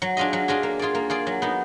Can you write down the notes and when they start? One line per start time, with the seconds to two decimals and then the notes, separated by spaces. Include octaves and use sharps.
0.02 F#3
0.17 D4 F4 G#4 D#5
0.33 F#3
0.48 D4 F4 G#4 D#5
0.63 A#3
0.79 F4 G#4 D5
0.95 A#3
1.10 F4 G#4 D5
1.27 F#3
1.42 B3 D#4